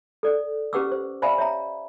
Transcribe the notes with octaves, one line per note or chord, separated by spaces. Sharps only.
A4 D5
C#4 G4 B4 F#5 D6 E6
C5
C5 D5 E5 F5 G#5 B5
C#5 E5 A#5